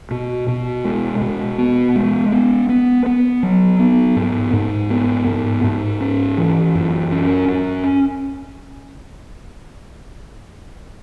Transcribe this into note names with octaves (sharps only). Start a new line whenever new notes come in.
B2
B2
G#3
B2
B3
G#3
B3
B3
B3
F#3
B3
G#2
G#2
B3
G#2
G#2
C#4
E3
F#2
C#4
F#2